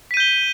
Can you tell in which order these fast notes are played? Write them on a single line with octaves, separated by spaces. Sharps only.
B6 D#7 G6 G7